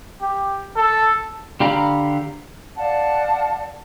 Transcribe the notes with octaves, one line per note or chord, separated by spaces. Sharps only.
G4
A4
D3 G4 F5 A#5 B5
D5 F5 F#5 A5